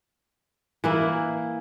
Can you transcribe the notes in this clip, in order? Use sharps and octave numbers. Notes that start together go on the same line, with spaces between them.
E3 A#3 E4